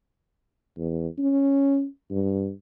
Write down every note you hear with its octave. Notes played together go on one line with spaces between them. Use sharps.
E2
C#4
G2